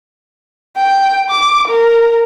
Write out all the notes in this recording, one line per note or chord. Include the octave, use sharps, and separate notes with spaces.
G5
D6
A#4